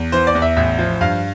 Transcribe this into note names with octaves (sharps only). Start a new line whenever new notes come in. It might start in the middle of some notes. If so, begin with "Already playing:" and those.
Already playing: E2
E3 C5
D5
E2
E5
A1 E5
F3
G2 F5